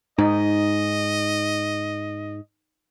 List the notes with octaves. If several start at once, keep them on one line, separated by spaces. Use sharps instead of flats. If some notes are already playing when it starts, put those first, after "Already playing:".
G#2 D#4 D#5